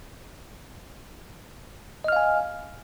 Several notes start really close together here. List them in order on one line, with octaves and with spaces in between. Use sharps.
D#5 F6 F5 G#5